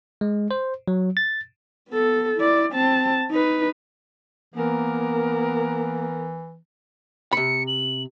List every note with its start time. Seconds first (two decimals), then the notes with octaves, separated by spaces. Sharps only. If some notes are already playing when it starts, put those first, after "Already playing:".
0.21 G#3
0.51 C5
0.88 F#3
1.17 A6
1.89 B3 A4
2.37 E4 D5
2.73 C4 A5
3.31 D#4 B4
4.54 E3 A#3 B3 A#4
7.33 C3 B5 C#7
7.67 F#7